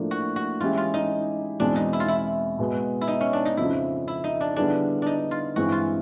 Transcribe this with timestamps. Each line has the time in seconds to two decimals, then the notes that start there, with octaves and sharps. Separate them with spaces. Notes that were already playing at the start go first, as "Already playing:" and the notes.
Already playing: A2 F3 A#3 D4
0.11 F#4
0.36 F#4
0.60 E3 G#3 C#4 E4 F4 G4
0.78 F4
0.94 D#4
1.59 E2 B2 G#3 C4 D4
1.76 D#4
1.93 E4
2.00 F4
2.08 E4
2.59 B2 G#3 B3
3.01 E4
3.08 D#4
3.21 C#4
3.33 D4
3.45 D#4
3.57 F2 C#3 F3 E4
4.08 E4
4.24 D#4
4.41 D4
4.56 D3 G3 B3 D4 E4 G#4
5.02 D4 D#4
5.31 F4
5.56 G2 E3 G#3 C4 E4 F#4
5.72 F4